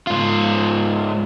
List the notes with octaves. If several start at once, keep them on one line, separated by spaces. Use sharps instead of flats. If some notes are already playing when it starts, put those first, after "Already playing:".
G#2 F4